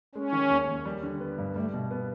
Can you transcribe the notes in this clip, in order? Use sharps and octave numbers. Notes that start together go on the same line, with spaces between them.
G#3 C#4
D#3
D#2
D#2
G3
D3
B3
G2
G3 A3
B2
B3